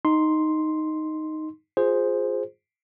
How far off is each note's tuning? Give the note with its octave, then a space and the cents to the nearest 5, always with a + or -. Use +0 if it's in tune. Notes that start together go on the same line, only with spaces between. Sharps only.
D#4 +0 C6 +0
F4 +20 G#4 +0 C5 +0